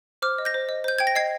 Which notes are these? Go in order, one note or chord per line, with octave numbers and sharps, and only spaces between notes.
C5 D6 F6
D#5
G6 A#6
C5
D#5
C5 G6
G5 G#6
A#6
D#5 G#6 C7